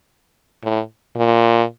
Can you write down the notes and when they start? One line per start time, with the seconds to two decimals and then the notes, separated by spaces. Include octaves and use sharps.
0.63 A2
1.16 A#2